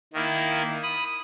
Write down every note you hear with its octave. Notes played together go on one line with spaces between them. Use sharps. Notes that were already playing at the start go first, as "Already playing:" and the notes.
D#3 A#3 E4
B5 D#6